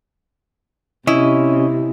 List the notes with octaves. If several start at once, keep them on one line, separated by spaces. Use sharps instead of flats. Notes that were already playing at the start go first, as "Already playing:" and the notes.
C3 C#4 E4 D#5